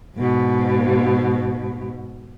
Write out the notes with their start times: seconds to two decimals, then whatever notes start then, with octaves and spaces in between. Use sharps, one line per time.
0.16 G#2 B2